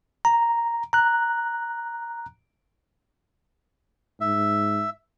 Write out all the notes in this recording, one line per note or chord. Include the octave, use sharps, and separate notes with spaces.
A#5
A#5 F#6
G#2 E5